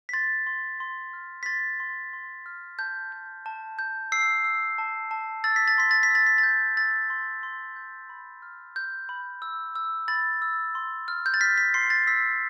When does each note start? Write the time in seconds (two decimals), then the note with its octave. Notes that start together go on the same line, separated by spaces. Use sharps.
0.09 B6
0.13 C6 A6
0.47 C6
0.80 C6
1.13 F6
1.43 B6
1.46 C6 A6
1.80 C6
2.13 C6
2.46 F6
2.79 A5 G6
3.12 G6
3.46 A5
3.79 G6
4.12 E6 C7
4.44 E6
4.78 A5
5.11 A5
5.44 E6 A6
5.56 B6
5.68 A6
5.78 C6 B6
5.91 A6
6.03 B6
6.10 E6 A6
6.27 B6
6.38 A6
6.43 G6
6.77 E6 A6
7.10 C6
7.43 C6
7.76 G6
8.09 B5
8.42 F6
8.76 F6 G6
9.09 B5
9.42 E6
9.76 E6
10.08 B5 A6
10.42 E6
10.75 C6
11.08 F6
11.26 G6
11.34 A6
11.41 F6 B6
11.58 B6
11.74 C6 C7
11.90 A6
12.07 E6 B6